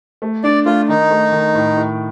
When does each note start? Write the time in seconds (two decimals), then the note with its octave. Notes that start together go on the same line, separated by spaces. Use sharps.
0.22 A3
0.44 D4 D5
0.66 A3 F4
0.89 D#3 D#4
1.11 A3
1.32 D#3
1.55 A2
1.77 A2